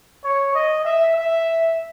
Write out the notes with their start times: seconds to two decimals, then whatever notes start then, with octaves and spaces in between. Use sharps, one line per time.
0.24 C#5
0.55 D#5
0.85 E5
1.16 E5